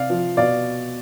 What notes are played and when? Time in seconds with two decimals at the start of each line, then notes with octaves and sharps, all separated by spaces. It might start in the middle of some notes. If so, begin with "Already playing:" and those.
Already playing: C3 D5 F5
0.10 F3
0.37 B2 D5 F5